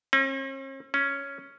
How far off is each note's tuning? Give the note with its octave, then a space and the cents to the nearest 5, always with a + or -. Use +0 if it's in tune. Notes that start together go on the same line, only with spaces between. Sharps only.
C#4 -45
C#4 +5